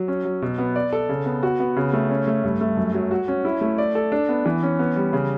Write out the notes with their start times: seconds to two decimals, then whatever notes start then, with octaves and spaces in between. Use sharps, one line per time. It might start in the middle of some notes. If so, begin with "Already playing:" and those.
Already playing: F#3
0.08 C#4
0.25 F#3
0.42 B2
0.58 B3
0.76 D5
0.93 A4
1.09 C#3
1.26 B3
1.43 F#4
1.60 B3
1.76 C#3
1.93 A3
2.10 C#4
2.27 A3
2.44 G2
2.61 A3
2.77 F#2
2.94 F#3
3.11 F#4
3.28 C#4
3.45 E4
3.61 A3
3.78 D5
3.95 A4
4.12 D4
4.29 B3
4.45 E3
4.63 C#4
4.79 B3
4.96 G3
5.13 C#3